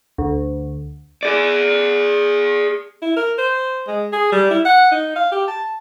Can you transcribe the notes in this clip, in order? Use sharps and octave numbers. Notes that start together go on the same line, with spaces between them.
D2
G#4 D5
E4
A#4
C5
G#3
G#4
G3
E4
F#5
D#4
F5
G4
A5